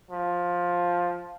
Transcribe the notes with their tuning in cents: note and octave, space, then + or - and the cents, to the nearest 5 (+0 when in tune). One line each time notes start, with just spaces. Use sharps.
F3 +10